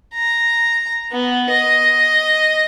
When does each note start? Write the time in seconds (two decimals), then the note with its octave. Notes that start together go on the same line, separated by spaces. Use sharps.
0.14 A#5
1.12 B3
1.50 D#5